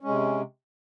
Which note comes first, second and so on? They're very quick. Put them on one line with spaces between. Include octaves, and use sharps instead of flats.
C#4 G#3 C3